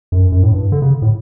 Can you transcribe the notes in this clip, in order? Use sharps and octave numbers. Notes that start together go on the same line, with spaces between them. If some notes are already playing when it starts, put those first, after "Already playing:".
F#2
F#2
A2
G2
D3
C#3
A2